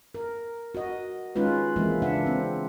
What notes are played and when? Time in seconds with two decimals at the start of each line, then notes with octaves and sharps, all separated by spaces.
0.15 A#4
0.75 F#4 D#5
1.35 G#3 C#4 D#4 F4 B4
1.76 E3 G#3 A#3 C4 E4
2.02 C#3 D4 E5 F#5
2.26 C4